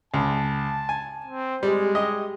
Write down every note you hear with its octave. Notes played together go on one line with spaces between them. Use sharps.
C#2 A5
G#5
C4
G3 G#3
G4 D#5